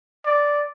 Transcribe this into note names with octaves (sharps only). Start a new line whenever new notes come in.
D5